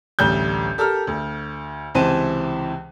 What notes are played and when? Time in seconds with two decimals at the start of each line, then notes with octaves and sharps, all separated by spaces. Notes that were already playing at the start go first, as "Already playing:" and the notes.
0.19 A1 D2 G3 G6
0.78 G4 A4 A#4 A#5 F6
1.07 D2
1.95 C#2 C3 E3 C5 A5 D#7